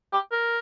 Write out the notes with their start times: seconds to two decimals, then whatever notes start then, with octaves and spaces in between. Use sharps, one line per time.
0.13 G4
0.32 A#4